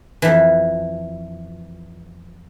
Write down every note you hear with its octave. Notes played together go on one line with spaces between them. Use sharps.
F2 E3